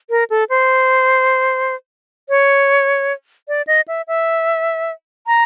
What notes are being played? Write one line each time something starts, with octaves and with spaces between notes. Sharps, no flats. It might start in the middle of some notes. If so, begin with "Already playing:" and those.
A#4
A4
C5
C#5
D5
D#5
E5
E5
A#5